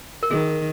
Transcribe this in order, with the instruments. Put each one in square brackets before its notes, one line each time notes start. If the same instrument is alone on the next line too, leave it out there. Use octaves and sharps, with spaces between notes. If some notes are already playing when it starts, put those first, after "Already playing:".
[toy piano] A#4
[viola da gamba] D#3 [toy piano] G#4